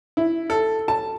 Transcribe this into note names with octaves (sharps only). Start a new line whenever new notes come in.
E4
A4
A5